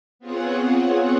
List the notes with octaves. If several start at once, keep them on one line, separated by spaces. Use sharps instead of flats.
B3 C4 F4 G#4 C#5 F#5